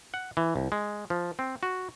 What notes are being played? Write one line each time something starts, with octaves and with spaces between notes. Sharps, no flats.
F#5
E3
C2
G#3
F3
C4
F#4